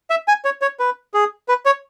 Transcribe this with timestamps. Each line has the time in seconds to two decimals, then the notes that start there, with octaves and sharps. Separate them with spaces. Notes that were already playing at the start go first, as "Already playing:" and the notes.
0.10 E5
0.28 G#5
0.45 C#5
0.62 C#5
0.80 B4
1.14 G#4
1.48 B4
1.66 C#5